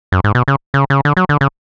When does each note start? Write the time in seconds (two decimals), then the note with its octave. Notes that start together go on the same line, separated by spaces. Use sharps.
0.12 F#2
0.24 G#2
0.35 B2
0.48 C#3
0.74 C#3
0.90 C#3
1.05 D3
1.17 F#3
1.29 D3
1.41 C#3